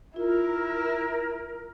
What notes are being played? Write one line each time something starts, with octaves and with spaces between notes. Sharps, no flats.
E4 F4 A#4